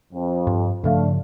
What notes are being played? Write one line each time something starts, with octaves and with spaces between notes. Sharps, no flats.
F2
G2
G2 C#3 F3 A3 D4 F5